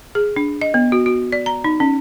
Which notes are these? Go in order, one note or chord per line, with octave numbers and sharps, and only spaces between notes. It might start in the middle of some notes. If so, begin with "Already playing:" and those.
G#4
D4
D#5
B3
F#4
F#4
D5
A#5
D#4
C#4